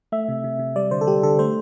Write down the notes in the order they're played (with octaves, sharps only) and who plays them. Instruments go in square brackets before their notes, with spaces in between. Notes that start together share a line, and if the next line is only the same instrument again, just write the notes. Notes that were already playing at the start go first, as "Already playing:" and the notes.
[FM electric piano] A3 E5
C3
C3
C3
G3 D5
D3 C5
A4
G3 G4
D3 A4
A3 C5